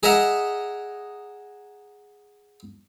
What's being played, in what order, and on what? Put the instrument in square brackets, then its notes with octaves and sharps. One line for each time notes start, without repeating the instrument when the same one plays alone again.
[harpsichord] G#4 A#4 D#5 E5 F#5 A#5